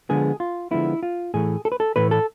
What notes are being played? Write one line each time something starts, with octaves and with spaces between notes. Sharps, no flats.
D3 F3 G#3 B3 G#4
F4
D3 F3 G#3 B3 E4
F4
A2 E3 A3 G#4
A4
B4
A4
A2 E3 A3 B4
A4